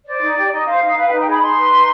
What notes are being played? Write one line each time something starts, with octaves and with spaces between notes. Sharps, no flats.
C5 D5
D#4
G4
D#4 D#5
C5 F5
D#4 F5
B4 F5
G5
D#4
G5
G#4 B5
D#4 C6
B4
D#4